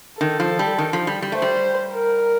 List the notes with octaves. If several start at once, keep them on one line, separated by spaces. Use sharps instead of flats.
D#3 A4
F3
G3
D#3
F3
G3
G3
A3 C5
G3
A#4